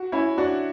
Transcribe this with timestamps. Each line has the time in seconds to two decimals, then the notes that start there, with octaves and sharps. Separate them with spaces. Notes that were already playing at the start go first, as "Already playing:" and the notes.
Already playing: F#4
0.12 C#4 E4
0.38 D4 F#4